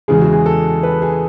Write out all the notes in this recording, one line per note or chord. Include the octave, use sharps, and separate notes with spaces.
E2 C#3 E3 G#3 G#4
F#4
G#4
A4
B4
G#4